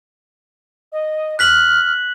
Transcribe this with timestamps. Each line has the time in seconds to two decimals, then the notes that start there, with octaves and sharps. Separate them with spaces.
0.92 D#5
1.39 F6 F#6 B6 F#7